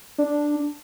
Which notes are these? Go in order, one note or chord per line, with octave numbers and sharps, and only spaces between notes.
D4